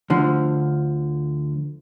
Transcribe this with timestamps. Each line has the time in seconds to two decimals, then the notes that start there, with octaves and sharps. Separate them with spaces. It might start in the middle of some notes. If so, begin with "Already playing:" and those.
0.10 D2 D3 F3